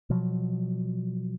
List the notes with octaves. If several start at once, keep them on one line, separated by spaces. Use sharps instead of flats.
B2 F3 F#3